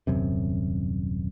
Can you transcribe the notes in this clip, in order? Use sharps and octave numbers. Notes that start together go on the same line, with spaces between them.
D#1 F#2 C3